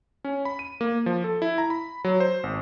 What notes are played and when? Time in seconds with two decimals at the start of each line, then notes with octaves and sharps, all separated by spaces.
0.24 C#4
0.45 B5
0.59 D#7
0.81 A#3
1.06 F3
1.24 A4
1.42 E4
1.58 A#5
1.70 B5
2.04 F#3
2.20 C5
2.43 G#1